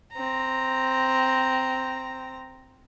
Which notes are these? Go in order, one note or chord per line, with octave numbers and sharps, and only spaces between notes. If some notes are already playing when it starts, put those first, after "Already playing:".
C4 A#5